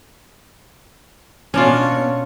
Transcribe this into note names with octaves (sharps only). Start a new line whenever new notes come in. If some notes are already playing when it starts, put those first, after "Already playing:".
B2 C#4 D4 F4 C#5